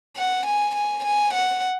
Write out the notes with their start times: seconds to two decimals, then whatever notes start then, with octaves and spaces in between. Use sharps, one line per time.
0.16 F#5
0.45 G#5
0.75 G#5
1.04 G#5
1.33 F#5